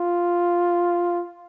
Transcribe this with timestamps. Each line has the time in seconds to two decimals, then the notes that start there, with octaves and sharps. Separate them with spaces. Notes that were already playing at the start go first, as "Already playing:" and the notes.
Already playing: F4